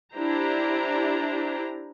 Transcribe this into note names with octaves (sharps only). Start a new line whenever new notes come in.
D4 E4 G4 C5 A#5